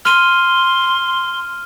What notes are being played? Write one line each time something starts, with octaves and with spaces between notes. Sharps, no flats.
C6 F6 D#7